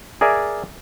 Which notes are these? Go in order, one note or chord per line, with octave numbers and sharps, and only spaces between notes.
G#4 A#4 D5 E5 G#5